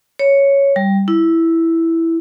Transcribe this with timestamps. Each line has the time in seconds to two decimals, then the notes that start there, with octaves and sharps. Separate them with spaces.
0.19 C#5
0.76 G3
1.08 E4